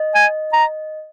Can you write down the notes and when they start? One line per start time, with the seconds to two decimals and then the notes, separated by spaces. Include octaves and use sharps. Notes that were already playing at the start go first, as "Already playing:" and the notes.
Already playing: D#5
0.15 G#5
0.53 A#5